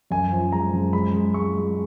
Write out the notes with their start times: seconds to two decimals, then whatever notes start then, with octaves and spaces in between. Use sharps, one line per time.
0.11 F#2 G#5
0.32 F3
0.52 G#3 A#5
0.73 F#2
0.93 G#3 B5
1.14 G#3
1.34 G#3 C#6
1.56 G#3